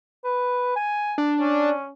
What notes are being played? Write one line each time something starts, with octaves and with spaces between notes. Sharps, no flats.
B4
G#5
D4
C#4